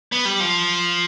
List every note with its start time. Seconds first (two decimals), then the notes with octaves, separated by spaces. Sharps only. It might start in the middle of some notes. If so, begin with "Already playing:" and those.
0.12 B3
0.25 G3
0.40 F3